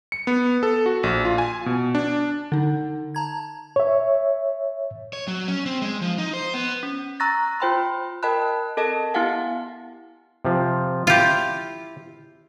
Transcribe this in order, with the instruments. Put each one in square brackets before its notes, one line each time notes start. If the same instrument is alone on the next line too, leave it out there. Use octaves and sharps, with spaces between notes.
[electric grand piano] C#7
B3
A4
F#4
A#1
F4
G#5
B2
D4
[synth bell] D3 D#4
A5 A#5 G#6
[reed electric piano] C#5 E5
[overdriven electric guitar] C#5
F#3
C#4
C4
G#3
F3
D#4
C5
B3
[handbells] C#4
A#5 C#6 E6 F#6 A6 A#6
F4 C5 G5 B5 C6
A#4 D#5 G5 A5 B5 F#6
C4 A4 A#4 D#5 A5
B3 E4 G4 F5 F#5 G#5
[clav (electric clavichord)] C3 F3
[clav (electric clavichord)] E4 [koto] F4 G4